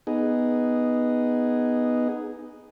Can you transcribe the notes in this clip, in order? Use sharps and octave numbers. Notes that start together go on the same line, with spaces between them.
B3 D#4 G#4